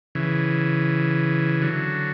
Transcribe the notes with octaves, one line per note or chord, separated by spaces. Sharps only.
C#3 E3
D3 F#3